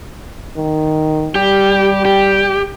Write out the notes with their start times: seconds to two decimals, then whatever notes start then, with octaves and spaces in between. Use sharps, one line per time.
0.57 D#3
1.35 G3 G4
2.05 G4